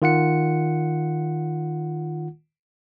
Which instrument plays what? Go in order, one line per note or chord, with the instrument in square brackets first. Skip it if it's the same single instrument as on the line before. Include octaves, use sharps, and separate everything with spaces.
[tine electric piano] D#3 F4 F#5 C#7